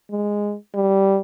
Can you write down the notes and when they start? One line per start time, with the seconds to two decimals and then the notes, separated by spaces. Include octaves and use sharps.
0.11 G#3
0.74 G3